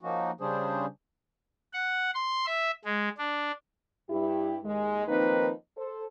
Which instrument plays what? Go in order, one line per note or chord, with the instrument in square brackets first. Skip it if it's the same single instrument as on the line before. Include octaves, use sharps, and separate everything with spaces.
[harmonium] F3 A#3 C#4 D#4 F#4
C#3 G3 C#4 D4 G#4 C5
[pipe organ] F#5
C6
E5
G#3
D4
[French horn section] G2 E4 G4
D#2 G#3
D#3 F3 A#3 C4 D#4 B4
A4 C5